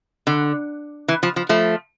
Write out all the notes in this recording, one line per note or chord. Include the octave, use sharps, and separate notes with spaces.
D3
E3
F3
F3
F3 A3